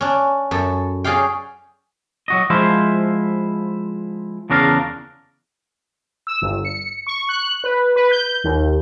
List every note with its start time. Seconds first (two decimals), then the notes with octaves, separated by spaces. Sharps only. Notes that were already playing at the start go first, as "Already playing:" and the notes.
0.01 C#4 D4
0.51 F#2 A4
1.04 C#4 F#4 G#4 D5 F5 G5
2.28 F#3 F#4 D#5
2.50 F3 G#3 E4 C5 F5
4.50 E2 C#3 D4 A#4 B4 F5
6.27 E6
6.42 G1
6.65 C#7
7.07 C#6
7.29 F#6
7.64 B4
7.96 B4
8.11 G6
8.44 D#2